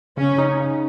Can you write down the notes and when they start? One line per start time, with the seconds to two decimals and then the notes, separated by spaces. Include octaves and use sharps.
0.17 C#3 C#4
0.38 D#4
0.60 C#3